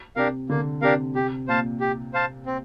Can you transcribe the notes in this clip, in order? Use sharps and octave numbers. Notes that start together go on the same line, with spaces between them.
C3 D4 G4 A#4 F5
D3 A#3
C3 D4 G4 A#4 F5
C3 G4
A#2 C5 F5 A5
G4
C5 F5 A5
C4